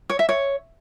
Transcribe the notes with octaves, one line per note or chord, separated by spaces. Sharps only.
C#5
E5
C#5